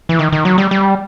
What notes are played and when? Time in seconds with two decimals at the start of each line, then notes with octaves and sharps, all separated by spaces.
0.09 E3
0.19 D#3
0.33 D#3
0.45 F#3
0.58 G3
0.71 G3